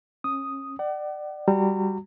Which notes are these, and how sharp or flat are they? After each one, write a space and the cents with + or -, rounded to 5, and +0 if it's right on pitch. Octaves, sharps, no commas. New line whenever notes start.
C#4 -25 D#6 +0
D5 +25 F#5 +40
G3 +0 F#4 +0 A#5 -35